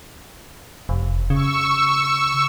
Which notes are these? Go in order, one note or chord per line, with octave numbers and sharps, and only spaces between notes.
F1
C#3 C#6 E6